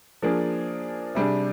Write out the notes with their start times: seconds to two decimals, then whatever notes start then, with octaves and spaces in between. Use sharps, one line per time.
0.22 F3 A#3 D4 G#4
1.15 C3 G3 D4 G#4